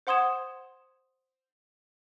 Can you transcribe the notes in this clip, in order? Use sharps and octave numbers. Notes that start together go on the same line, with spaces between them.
C5 F#5 C6 D#6 G#6 E7